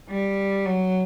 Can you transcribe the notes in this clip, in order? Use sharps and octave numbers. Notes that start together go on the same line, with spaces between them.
G3
F#3